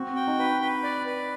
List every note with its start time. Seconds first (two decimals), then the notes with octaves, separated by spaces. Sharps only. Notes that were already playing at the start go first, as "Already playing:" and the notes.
Already playing: C4 F#4
0.16 G5
0.27 D#4
0.39 B4
0.61 B4
0.83 D5
1.06 B4